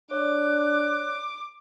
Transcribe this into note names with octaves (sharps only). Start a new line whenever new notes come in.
D4 C#5 D5 D6 F#6